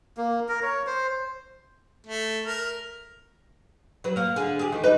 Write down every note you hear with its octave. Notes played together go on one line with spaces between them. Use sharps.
A#3
A#4
C#5
C5
A3
A#4
F#3 B4
A#3 A#4
D3 G#4
G4 G#4
D#3 E3 A3
G3 D#4 B4